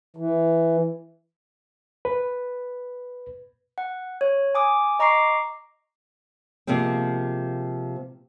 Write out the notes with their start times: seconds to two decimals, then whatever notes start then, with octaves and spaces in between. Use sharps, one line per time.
0.16 E3
2.05 B4
3.78 F#5
4.21 C#5
4.55 G#5 D6 D#6
4.99 D#5 A#5 C#6 D6 C7
6.67 C3 F3 G#3 A#3 C4